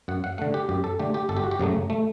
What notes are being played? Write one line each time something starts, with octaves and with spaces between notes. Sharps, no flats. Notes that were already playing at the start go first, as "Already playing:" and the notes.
F#2 F#5
F#5
D3 A3 F#5
G4
F#2 G4
A4
D3 A3 G4
G4
G1 A4
G4
F#4
G4
F#2 C#3 F#3 A3
A3